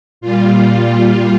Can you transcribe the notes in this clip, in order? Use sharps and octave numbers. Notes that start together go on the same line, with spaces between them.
A#2 G3 F4